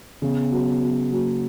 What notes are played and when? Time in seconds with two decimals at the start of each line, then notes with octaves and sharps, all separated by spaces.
0.22 C#3 B3
0.52 F#3
0.82 F#3
1.12 F#3 A#3